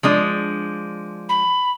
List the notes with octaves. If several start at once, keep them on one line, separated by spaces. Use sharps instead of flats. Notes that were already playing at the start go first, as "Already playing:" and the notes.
F3 G#3 D4
B5